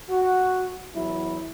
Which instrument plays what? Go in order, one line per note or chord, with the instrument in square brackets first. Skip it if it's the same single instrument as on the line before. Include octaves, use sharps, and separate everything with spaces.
[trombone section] F#4
E2 F#3 E4